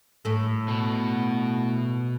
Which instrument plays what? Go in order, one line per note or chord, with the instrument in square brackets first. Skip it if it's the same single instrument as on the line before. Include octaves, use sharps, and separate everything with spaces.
[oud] A2 A4
[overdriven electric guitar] B2